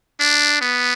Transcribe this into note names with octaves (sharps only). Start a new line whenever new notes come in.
D4
B3